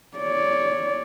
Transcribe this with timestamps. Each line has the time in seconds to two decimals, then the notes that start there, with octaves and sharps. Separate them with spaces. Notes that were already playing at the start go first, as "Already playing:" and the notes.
0.18 C#5 D5